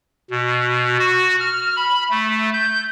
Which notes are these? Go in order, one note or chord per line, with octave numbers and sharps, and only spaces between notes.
B2
F#4
F6
B5
A3
G6